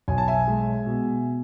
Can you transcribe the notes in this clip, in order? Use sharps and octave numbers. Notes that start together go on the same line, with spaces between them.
B1 G#5
A5
E5 G#5
G#3
B2